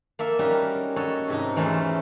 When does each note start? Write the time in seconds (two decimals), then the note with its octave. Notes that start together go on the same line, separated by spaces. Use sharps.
0.19 A#3 A4 E5
0.39 G3 C#4 D#4 F#4
0.96 F#4 A4 C#5 D#5
1.28 G#2 C3 D#4
1.56 E2 E3 A3 C#4 A4 C5